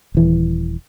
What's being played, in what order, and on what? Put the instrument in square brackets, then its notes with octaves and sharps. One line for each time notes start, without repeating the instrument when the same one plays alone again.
[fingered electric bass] D#1 E3